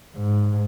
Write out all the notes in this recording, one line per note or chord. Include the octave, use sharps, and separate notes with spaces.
G#2